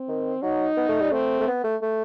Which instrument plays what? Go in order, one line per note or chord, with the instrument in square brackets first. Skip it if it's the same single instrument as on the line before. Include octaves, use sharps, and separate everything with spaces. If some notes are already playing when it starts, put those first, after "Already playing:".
Already playing: [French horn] C4
[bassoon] D#3
[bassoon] F#3 [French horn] D#4
[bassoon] B3
A3
G3
[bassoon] A3 [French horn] C4
[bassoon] A3
B3
A3
A3